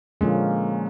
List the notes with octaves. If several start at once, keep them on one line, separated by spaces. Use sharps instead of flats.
A#2 D3 F3 G#3 A#3 C#4